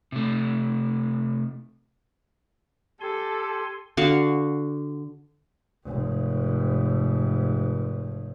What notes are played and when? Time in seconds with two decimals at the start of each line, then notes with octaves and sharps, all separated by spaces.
0.12 C3 A3
3.01 G4 A4 G#5 C6
3.97 D3 F#4 F5 C#6
5.85 F1 G#2